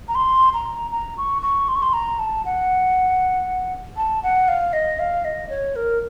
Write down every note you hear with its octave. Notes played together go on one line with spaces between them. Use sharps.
A#5
C6
A#5
A#5
C#6
C#6
C6
C#6
C6
A#5
A5
F#5
A5
F#5
F5
D#5
F5
D#5
C#5
A#4